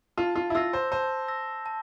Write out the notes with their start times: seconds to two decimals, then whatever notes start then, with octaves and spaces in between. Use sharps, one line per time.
0.17 F4 A5
0.36 F4
0.50 E4
0.55 F4 E6 A#6
0.73 C5
0.92 C5 A5
1.28 E6 A#6
1.66 A5